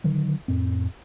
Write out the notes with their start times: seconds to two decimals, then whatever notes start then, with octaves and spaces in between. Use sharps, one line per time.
0.04 D3 D#3 F#3
0.48 F2 A2 C4